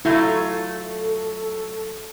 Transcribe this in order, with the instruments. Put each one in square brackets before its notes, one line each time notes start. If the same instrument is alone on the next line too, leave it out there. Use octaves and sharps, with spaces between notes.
[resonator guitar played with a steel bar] F#3 A3 F4 [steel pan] E4 [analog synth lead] A4